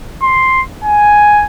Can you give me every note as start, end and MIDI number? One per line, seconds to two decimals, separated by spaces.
0.22 0.62 84
0.84 1.46 80